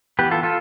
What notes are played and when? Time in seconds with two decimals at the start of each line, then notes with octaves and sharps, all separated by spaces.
0.19 E3 B3 G4 B4
0.31 F4 A4
0.43 F4 A4